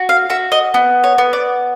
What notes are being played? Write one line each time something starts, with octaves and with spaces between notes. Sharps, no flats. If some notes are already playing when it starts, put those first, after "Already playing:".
Already playing: F#4
F5
F#4 E5
D#5
B3
C#5
B3
D5